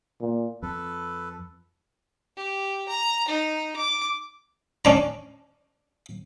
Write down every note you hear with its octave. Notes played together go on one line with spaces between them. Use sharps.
A#2
F2 A4 B4
G4
A#5
D#4
D6
C#4 D4 A#5